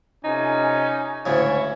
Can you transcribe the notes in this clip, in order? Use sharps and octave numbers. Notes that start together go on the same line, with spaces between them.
F2 C3 C#4 D#4 G#5
D2 G#2 C#3 C#4 E4 C#5